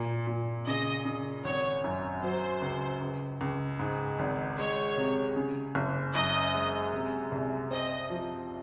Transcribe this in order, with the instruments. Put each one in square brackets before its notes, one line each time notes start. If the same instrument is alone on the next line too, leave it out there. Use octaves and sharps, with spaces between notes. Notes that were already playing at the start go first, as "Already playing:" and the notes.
Already playing: [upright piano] A#2
A#2
[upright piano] C#3 [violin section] D#5
[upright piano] C#3
[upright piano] G#1 [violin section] C#5
[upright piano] F#2
[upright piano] F#3 [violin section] C5
[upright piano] C#2
C#2
C#2
G#2
G#1
[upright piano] G#3 [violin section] C#5
[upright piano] C3
C#3
F#1
[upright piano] F#2 [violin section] D#5
[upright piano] G#3
C3
C2
[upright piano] C4 [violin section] D#5
[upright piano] F3